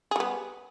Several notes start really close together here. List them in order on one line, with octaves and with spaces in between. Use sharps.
G#4 G3 B3